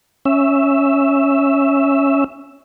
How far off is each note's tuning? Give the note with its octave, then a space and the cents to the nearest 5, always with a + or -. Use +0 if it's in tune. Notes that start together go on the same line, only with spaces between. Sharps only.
C#4 +0 E5 +0